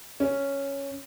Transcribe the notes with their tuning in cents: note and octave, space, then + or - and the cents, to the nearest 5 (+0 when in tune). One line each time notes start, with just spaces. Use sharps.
C#4 +0